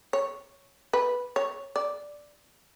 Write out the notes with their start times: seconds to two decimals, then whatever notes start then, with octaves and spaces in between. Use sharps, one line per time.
0.13 C#5
0.93 B4
1.36 C#5
1.76 D5